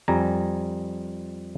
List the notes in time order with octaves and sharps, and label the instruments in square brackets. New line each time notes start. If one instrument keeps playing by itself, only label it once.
[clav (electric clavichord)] F2 G3 G#5 A#5